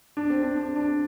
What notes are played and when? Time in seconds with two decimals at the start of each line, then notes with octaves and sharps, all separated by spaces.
0.17 D4
0.30 C4
0.43 D4
0.56 D4
0.76 D4